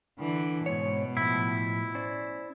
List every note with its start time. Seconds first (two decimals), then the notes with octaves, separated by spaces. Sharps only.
0.19 D3 E3
0.66 G#2 B2 G#3 C#5
1.17 A2 F3 E4
1.95 C#4 C5 D5